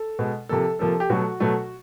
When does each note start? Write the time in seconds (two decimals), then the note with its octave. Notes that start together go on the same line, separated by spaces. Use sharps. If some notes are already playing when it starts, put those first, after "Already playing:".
Already playing: A4
0.19 B2 G#3
0.49 C3 F3 A#3 A4
0.79 C3 F3 A#3 A4
1.00 G4
1.10 B2 F#3 A3 F#4
1.40 B2 F#3 A3